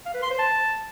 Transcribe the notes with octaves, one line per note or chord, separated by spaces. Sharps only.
F5
B4
C6
C5
A5